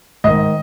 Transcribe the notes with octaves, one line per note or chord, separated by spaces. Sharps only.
G#2 D#3 D#5